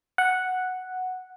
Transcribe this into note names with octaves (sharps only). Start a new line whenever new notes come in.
F#5